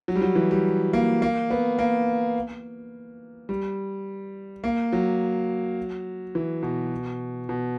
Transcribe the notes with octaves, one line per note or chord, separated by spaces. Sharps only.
F#3
G3
F#3
E3
G3
A#3
A#3
B3
A#3
G3
A#3
F#3
E3
B2
B2